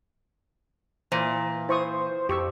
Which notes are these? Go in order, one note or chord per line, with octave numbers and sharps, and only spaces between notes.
A#2 E3 C5
E4 C5 C#6 D#6
F2 G4 C#6 E6